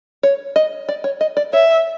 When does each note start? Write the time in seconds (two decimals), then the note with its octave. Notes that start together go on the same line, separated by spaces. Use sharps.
0.23 C#5
0.56 D#5
0.89 D5
1.04 C#5
1.21 D#5
1.37 D5
1.53 C#5 E5